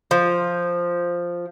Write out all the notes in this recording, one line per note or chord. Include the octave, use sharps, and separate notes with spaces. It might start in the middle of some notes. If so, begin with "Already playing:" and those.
F3